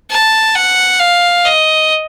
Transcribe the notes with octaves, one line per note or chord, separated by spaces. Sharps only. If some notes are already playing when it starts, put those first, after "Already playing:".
A5
F#5
F5
D#5